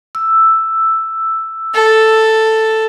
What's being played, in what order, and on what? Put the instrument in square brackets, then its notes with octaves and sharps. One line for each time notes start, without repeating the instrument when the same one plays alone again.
[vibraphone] E6
[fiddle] A4